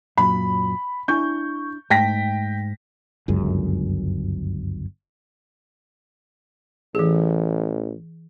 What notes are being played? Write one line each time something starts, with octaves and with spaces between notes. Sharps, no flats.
F#2 A#2 F#3 B5
D4 E4 G#5 C#6 G6
G#2 A3 G5 A5 A#6 B6
G1 C#2 F#2 G#3
A1 E3 G#4